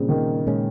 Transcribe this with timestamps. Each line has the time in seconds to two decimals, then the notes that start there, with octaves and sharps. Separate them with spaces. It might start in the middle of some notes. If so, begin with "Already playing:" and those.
Already playing: A#2 C#3 G3 C4
0.09 D#3
0.47 A#2 G#3 C#4